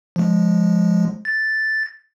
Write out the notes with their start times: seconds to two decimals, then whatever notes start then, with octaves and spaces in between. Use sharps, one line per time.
0.16 F3 G#3
1.25 A6